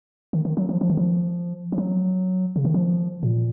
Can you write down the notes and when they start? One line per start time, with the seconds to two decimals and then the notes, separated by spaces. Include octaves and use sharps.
0.33 D#3
0.45 D#3
0.57 F#3
0.69 F3
0.81 F3
0.90 D#3
0.97 F3
1.72 F3
1.78 F#3
2.56 C#3
2.65 D#3
2.74 F3
3.23 A#2